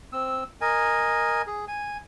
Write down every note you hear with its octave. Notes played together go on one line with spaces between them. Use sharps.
C4 E6
A#4 D#5 G#5
G#4
G#5